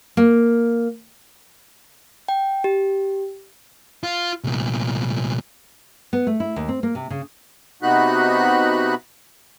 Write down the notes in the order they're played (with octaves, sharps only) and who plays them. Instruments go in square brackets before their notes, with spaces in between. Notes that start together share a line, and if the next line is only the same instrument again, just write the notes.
[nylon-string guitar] A#3
[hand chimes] G5
G4
[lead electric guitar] F4
C2 A#2
[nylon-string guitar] B3
A3
E4
D#2
C4
A#3
C3
C#3
[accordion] C3 B3 D#4 F#4 B5 F#6